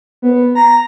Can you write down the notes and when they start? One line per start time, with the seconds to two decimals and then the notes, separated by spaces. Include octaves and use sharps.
0.22 B3
0.55 A#5